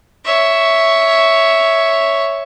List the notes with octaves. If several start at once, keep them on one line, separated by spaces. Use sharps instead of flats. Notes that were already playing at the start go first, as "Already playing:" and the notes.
C#5 E5